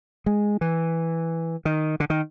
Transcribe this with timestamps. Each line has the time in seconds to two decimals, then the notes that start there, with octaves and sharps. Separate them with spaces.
0.26 G#3
0.61 E3
1.65 D#3
2.00 D3
2.10 D#3